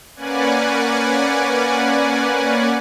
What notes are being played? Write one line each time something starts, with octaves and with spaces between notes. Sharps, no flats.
A#3 C#4 B4 D5 F#5 G#5